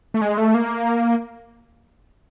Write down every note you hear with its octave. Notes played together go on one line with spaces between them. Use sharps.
A3
G#3
A3
A#3